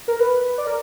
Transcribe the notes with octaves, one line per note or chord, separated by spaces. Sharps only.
A#4
B4
D5
A#4